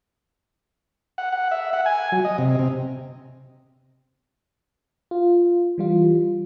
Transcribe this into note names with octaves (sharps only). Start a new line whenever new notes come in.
F#5
F#5
E5
F#5
G#5
F#3
D#5
C3
C3
F4
E3 G3 F4